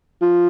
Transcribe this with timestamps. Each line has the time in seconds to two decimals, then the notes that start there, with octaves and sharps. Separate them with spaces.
0.21 F3